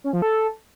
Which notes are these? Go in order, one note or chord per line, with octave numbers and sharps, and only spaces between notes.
C#4
F3
A4